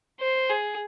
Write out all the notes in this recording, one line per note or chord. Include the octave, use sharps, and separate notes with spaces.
C5
G#4